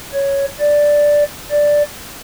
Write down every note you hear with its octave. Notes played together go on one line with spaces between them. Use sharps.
C#5
D5
D5